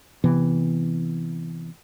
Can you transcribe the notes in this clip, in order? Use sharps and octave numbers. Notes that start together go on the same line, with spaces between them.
C3 E3 B3